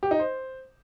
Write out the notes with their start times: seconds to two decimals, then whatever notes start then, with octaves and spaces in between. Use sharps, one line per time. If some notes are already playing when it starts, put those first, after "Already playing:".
0.03 G4
0.11 D#4
0.19 C5